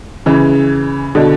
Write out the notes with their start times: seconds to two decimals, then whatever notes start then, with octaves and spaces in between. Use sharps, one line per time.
0.26 C#3 E3
1.15 B2 D3